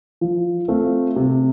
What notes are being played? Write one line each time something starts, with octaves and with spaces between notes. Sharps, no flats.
F3
A3 C4 F4
C3